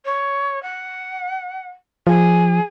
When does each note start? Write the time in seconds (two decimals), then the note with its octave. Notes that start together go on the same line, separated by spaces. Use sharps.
0.05 C#5
0.62 F#5
2.07 F3 G#4